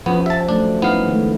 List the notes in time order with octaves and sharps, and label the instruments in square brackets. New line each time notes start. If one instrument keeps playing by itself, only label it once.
[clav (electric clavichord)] E2 B3 [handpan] F3 C#4
[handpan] G4 [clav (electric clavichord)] E5 A5
[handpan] F#3 G3 A3 [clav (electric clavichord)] D4
[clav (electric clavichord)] B3 F5 [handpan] C#4 D#4 E4
[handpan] D#3 G#3 A3